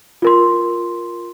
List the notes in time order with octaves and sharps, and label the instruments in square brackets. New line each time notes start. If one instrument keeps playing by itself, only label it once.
[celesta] F4 A#4 C6